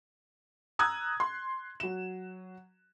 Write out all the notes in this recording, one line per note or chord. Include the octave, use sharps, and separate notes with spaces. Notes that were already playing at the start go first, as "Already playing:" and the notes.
A#5 D#6 E6 F#6 G#6
C6
F#3 E7